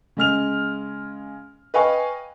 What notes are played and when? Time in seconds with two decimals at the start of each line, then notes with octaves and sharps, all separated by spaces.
0.17 C#3 G#3 F6 F7
1.74 B4 D#5 F5 G5 G#5 C#6